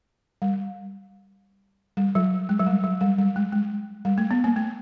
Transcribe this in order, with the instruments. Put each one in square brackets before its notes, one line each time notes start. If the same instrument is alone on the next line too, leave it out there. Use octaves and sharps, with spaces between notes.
[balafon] G3
G3
F#3
G#3
F#3
G3
F#3
G3
G3
G#3
G#3
G3
A3
B3
A#3
A3